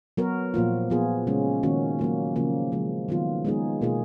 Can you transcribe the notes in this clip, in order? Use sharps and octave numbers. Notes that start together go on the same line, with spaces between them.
F#3 B3 F#4 A#4
A#2 F3 A#3 F4
F3 B3 F4 G#4
C#3 G#3 C#4
D#3 A#3 C#4 F#4
F#3 A#3 F4
C#3 F3 A#3
C#3 F3 G#3
D#3 F#3 B3 F4
G#3 B3 D#4 G#4
B2 A#3 F4 G#4